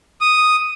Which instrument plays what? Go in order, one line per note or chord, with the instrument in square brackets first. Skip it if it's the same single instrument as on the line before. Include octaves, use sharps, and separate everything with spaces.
[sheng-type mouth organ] D#6